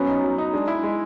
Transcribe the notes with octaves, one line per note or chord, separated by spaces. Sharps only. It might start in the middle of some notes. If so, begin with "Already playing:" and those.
Already playing: F#3 B3 C#4
D#4
F#3
D#4
G#3 D4
E4
G#3